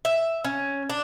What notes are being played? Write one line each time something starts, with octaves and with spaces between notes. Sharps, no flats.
E5
C#4
D4